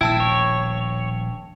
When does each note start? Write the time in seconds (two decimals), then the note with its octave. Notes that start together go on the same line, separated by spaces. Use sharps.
0.01 D#1 A#1 B2 E4 G5 A5 E6
0.20 C#5